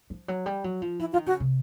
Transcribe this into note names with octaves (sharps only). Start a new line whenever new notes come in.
F3
F#3
G3
F#3
F3
E3 E4
D#3 F4
C#3 F#4
C3